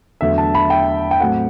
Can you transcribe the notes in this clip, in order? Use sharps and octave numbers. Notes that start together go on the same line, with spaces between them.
E2 D3 F#3 A3 E5
A5
B5
G5
G5
A2 F#3 A3 C4 F#5